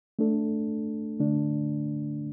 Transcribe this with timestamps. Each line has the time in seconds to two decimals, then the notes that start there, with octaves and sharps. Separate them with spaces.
0.19 A3 D4 A4
1.19 D3 A3 D4